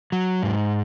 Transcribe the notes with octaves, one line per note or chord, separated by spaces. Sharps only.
F#3
G#2